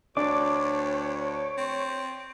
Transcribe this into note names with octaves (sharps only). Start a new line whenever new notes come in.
D2 D4 C#5 D6
C4